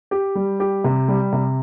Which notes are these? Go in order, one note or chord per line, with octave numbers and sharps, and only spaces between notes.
G4
G3
G4
C3
G3
C3